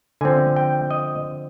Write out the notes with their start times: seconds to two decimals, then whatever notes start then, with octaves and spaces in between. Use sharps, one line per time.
0.21 D3 F3 C4 G#5
0.56 G5
0.91 D#5